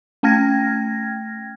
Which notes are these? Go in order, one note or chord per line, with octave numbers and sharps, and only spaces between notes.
A3 C#4 G5 F6 G#6 A#6